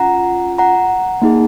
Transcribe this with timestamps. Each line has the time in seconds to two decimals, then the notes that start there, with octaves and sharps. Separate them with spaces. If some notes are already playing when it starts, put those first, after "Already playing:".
Already playing: C#4 F4 F#5 A#5
0.58 F#5 A#5
1.22 A#3 D#4 G#4